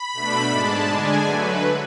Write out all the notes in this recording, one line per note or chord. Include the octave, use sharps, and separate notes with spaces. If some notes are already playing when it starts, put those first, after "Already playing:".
Already playing: B5
B2 A3 D4
G#2 G#3 D4 A5
D3 G#3 D4 G#5
D3 F#3 A3 B4